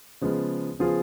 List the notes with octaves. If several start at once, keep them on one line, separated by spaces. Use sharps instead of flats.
C#3 F3 G#3 B3
C#3 F3 B3 F4 G#4